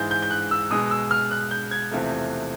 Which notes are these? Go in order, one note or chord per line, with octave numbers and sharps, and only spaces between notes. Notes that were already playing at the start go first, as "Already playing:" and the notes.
Already playing: G#2 E3 G#3 G6
G6
G6
F#6
E6
B2 G#3 D#6
E6
F6
F#6
G6
G#6
E2 C3 F3 A3